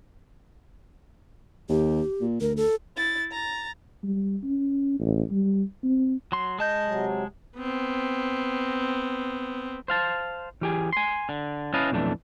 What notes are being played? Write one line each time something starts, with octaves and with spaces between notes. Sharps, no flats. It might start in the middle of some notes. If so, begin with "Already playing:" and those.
D#2 G4
A#2
D2 A#4
A4
E4 A6
A#5 A6
G3
C#4
A1
G3
C4
F#3 C6
G#3 D#5 A5 G6
C3 F#3
B3 C4
C5 F5 A5
E3 G4 G#4
G#5 C6
D3
C#4 E4 B4 D#5 F5 A5
B1 F2 E3 A3 D4